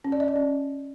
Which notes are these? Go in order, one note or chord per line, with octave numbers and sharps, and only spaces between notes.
C#4
D5
D#5
D5
C#4